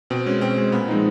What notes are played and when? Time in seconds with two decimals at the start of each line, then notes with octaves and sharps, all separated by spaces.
0.10 B2 C4
0.26 G#3 C#4
0.41 B2 C4
0.57 G#3 C#4
0.72 A#2 B3
0.88 F3 G#3 C4 D#4